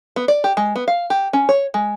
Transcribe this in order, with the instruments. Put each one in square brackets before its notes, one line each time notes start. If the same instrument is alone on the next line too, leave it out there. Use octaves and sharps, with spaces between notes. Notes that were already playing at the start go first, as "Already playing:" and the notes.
[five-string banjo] B3
D5
G4
G#3
B3
F5
G4
C#4
C#5
G#3